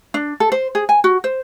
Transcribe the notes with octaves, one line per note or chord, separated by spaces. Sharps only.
D4
A4
C5
G#4
G#5
F#4
C5